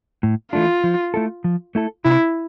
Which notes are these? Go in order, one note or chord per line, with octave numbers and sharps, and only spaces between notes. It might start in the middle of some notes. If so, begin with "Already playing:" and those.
A2
E3 A3 D4 F4
F3
A3 E4 A4
F3
A3 E4 A4
C3 E4